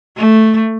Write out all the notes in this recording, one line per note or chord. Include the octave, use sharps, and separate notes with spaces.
A3